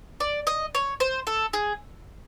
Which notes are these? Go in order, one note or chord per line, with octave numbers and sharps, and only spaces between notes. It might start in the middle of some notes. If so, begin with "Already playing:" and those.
D5
D#5
C#5
C5
A4
G#4